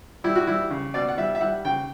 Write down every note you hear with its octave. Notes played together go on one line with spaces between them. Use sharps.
G3 E4
F#4
G3 E4
C#3
B2 D5
F#5
G3 E5
E5
G3 F#5
C#3 G5